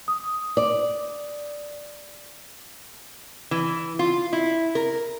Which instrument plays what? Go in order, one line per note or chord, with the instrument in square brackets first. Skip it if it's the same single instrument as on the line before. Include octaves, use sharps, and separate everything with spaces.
[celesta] D#6
[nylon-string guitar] D5
[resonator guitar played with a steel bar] E3
F4
E4
A#4